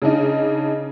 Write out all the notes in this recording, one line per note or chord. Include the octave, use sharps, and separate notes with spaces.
C#3 D4 D#4